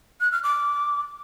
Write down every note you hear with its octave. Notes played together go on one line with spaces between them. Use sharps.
F#6
F6
D6